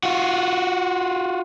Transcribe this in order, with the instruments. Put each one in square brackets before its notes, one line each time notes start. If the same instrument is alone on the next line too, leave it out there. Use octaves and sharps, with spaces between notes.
[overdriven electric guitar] F4 F#4